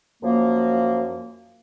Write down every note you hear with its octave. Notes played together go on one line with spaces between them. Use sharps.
F#2 F3 A#3